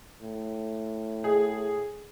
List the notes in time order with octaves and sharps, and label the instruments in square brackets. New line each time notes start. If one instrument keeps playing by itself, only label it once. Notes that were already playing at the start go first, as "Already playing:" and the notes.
[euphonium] A2
[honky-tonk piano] G#4